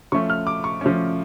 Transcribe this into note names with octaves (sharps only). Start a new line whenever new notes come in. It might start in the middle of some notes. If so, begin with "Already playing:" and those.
F3 A3 C#4 C#6
F6
D6
C#6
F3 A3 C#4